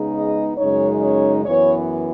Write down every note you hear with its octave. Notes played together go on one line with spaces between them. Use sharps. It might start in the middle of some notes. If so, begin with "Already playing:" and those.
Already playing: C#3 G#3 B3 D#4
D#5
F#2 C#3 G#3 D#4 C#5
C#5
F#2 E3 B3 C#5